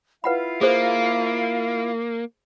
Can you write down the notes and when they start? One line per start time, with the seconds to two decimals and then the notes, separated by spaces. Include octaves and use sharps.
0.24 E4 F4 B4 F5 F#5 B5
0.61 A#3 G#4 A4 C5